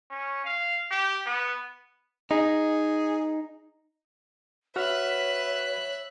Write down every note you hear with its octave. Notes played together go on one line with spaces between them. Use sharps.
C#4
F5
G4
B3
D#4 G#4
F#4 B4 C#5 E5 F#5 F6 F#6